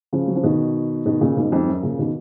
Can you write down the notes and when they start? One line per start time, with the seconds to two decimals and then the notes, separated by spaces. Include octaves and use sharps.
0.13 C#3 F3
0.28 F#3
0.36 F3
0.43 B2 D#3
1.06 B2 D#3
1.21 A#2 C#3
1.37 G#2 B2
1.52 F2 G#2
1.68 F#2
1.83 A#2 C#3
1.99 B2 D#3